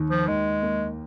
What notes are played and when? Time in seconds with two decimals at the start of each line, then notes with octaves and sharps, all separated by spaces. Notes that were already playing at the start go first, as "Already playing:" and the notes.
Already playing: D#2 D#3
0.10 F3
0.28 D#2 G#3
0.63 A#3